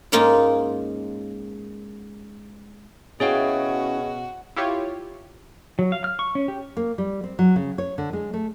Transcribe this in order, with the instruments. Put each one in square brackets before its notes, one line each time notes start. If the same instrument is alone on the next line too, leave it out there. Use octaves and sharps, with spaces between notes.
[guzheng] G#2 G#3 A#3 C#4 D#4 F4
[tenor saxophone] B2 [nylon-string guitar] C#4 E4 F5 [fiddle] F#4 [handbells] G#4 C#5 G5
[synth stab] E4 F4 G4 C#5
[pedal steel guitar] F#3
F5
F6
C#6
C#4
G4
[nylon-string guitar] A#3
G3
C4
F#3
C#3
C#5
D3
G#3
A3